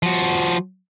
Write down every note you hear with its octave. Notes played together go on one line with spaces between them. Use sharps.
F3 F#4